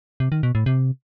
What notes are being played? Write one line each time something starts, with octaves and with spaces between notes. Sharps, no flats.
C3
D#3
B2
A2
C3